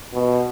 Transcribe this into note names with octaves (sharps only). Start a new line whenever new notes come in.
B2